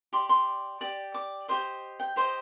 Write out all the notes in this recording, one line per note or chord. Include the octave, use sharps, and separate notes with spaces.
G4 D5 C6
C6
G4 D5
D6
G4 C5 D#5
G5
G4 C5 D#5